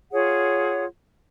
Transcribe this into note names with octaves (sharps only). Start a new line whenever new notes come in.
F4 G#4 C#5 F#5